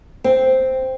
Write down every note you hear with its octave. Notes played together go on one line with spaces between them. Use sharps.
C4